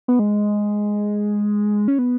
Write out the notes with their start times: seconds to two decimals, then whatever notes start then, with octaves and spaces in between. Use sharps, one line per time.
0.08 B3
0.19 G#3
1.88 C#4
1.99 B3